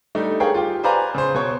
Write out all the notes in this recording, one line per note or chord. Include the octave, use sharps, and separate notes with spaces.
G3 A3 D4 D#4
G#4 A#4 C#5 F5 G5
F4 G4
B4 C5 D5 F5 G#5 A#5
C#3 C5
B2 C#5